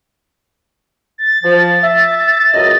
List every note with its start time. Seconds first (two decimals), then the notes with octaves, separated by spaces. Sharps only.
1.18 A6
1.44 F3
1.83 E5
2.54 C#2 F#2 D#5